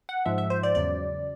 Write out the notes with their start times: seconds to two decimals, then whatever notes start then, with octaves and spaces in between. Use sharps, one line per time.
0.09 F#5
0.26 G#2 F3 G#3 E5
0.38 E5
0.50 C5
0.63 D5
0.75 E2 C#3 F#3 D5